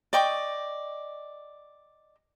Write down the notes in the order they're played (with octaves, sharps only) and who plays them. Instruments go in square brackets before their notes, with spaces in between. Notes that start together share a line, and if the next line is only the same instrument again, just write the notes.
[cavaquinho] D5 D#5 G5 C#6